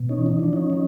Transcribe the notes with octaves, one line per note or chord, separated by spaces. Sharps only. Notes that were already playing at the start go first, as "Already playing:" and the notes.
Already playing: B2
C#4 D#4
E3
D#4
F3 D4
C#4 D#4
F3